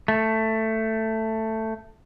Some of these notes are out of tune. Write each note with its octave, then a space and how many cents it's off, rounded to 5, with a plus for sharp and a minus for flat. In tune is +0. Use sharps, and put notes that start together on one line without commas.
A3 +10